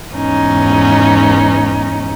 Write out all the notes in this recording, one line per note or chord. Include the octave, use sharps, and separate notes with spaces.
E2 G#2 C#4 D#4